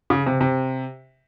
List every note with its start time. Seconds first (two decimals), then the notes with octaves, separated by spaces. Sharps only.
0.10 C#3
0.26 C3
0.41 C3